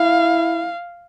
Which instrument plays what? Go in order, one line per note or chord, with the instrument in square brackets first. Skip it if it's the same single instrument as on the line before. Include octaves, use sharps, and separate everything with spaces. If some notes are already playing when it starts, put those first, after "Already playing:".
Already playing: [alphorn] E4 [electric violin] F5